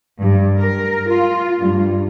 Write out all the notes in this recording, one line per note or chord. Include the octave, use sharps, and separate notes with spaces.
G2
A#4
F4
G2